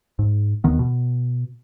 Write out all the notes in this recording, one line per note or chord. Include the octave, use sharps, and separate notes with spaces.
G#2
D#2 D#3 B3
B2